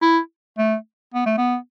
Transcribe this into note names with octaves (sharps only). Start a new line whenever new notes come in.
E4
A3
B3
A3
B3